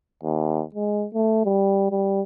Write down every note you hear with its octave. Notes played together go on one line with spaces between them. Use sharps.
D#2
G#3
A3
G3
G3